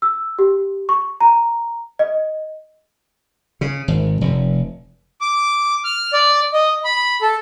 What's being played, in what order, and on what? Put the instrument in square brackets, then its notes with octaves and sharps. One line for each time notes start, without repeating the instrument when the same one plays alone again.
[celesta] E6
G4
C#6
A#5
D#5
[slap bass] C#3
G#1
F1
[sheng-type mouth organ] D6
F6
D5
D#5
B5
A4